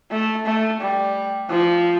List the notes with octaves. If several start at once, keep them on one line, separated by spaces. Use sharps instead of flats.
A3
A3
G3
F3